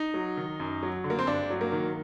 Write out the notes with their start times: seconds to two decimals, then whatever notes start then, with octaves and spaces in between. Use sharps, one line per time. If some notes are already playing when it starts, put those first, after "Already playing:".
Already playing: D#4
0.14 F#3
0.37 D#3
0.60 F#2
0.83 F#3
1.04 D3
1.10 A#3
1.19 C4
1.27 G2 D4
1.50 F#3
1.61 A#3
1.72 D#3